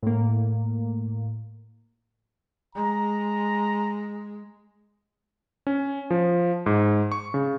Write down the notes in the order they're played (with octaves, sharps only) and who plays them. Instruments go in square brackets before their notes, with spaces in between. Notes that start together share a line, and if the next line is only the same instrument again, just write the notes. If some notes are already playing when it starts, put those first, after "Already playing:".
[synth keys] A2 A#3
[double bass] G#3 [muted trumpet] A#5
[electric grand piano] C#4
F3
G#2
C#6
C#3